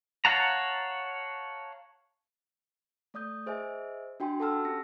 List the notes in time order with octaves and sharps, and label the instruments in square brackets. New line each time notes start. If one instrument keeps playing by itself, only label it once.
[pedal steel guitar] C#5 F5 F#5 A5 A#5
[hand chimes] A3 D5 D#6 G6
G#4 C5 D#5 E5 G#5
D4 F#4 G5 G#5 C6
A4 F#5 A5 E6 F6
C#4 G4 A#6